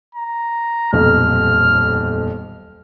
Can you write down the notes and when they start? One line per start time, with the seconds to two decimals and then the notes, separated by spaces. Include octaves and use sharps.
0.15 A#5
0.93 D#1 B1 F2 F6